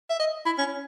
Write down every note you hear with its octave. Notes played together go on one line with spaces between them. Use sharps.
E5
D#5
E4
C#4